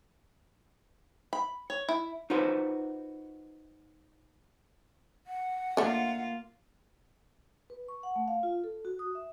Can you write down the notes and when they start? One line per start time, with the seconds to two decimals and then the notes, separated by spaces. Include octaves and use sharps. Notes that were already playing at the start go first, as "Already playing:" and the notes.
1.33 B5
1.70 C#5
1.89 E4
2.30 D#4 F4 F#4 B4 C5
5.27 F#5
5.77 D3 A3 A#3 F4
7.70 B4
7.89 C#6
8.03 F#5
8.16 A3
8.28 F5
8.43 F4
8.64 A4
8.85 F#4
8.99 D#6
9.15 E5